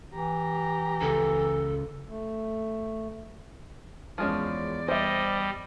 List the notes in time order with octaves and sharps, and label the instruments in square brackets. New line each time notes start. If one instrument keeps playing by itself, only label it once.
[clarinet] E3 [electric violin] G4 A#5
[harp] C#2 [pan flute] A4
[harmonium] A3
[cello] E2 D5 [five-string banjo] F3 G#3 C#4
[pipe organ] G3 [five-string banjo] C5 E5 [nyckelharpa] D#5